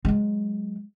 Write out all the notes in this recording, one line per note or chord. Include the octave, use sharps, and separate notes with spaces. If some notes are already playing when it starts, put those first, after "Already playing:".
F#3 G#3